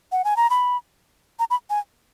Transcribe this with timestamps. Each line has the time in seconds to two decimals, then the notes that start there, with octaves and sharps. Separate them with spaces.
0.12 F#5
0.25 G#5
0.37 A#5
0.50 B5
1.39 A#5
1.50 B5
1.70 G#5